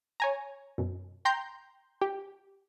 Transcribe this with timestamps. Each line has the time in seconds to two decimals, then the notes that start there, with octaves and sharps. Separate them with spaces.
0.20 C#5 G#5 A#5
0.78 F#2 B2
1.25 G5 A#5 C6 G6
2.01 G4